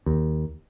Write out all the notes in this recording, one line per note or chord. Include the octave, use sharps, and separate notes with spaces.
D#2